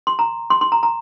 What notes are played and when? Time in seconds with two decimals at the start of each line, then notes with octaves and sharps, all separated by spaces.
0.07 C6
0.19 A#5
0.50 C6
0.61 C6
0.72 A#5
0.83 A#5